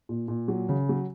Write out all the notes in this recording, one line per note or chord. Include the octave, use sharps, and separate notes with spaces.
A#2
A#2
F#3
C#3
F#3